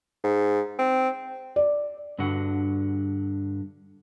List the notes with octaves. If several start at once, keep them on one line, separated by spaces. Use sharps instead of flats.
G#2
C4
D5
G2 D3 F#4 F#5